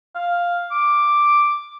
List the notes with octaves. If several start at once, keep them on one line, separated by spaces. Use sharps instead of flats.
F5
D6